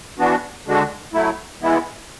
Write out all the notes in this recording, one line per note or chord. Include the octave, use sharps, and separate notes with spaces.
E3 B3 D4 F#4
D3 G#3 D4 F#4
F#3 A3 E4
E3 G#3 B3 E4